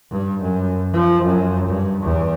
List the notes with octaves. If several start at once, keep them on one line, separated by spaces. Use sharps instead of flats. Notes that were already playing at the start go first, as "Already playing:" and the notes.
G2
F#2
F3
F#2
G2
E2